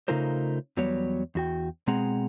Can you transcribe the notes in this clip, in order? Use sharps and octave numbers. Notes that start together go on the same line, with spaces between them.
C#3 A3 D#4 F4 A#4 C5
E2 F#3 G3 B3 C#5
E2 F#4 G5
B2 G#3 C4 G#4 F#5 A#5